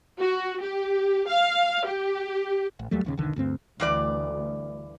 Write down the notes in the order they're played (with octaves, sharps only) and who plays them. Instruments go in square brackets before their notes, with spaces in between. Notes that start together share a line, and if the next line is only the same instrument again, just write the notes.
[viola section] F#4
G4
F5
G4
[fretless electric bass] A1
D#2 F#3 G3 A3
D#1 D#2 C#3
E1 B1 D3 D#3
D2 G2 C4
[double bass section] D2 [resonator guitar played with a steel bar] G2 E3 D5